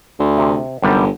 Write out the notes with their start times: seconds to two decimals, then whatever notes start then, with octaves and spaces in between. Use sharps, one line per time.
0.19 D2
0.38 C3
0.82 G1 F#2 C3 G3